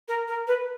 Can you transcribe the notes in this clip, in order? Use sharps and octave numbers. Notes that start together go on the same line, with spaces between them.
A#4
A#4
B4